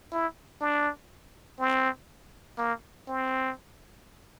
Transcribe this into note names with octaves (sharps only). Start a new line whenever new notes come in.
E4
D4
C4
A#3
C4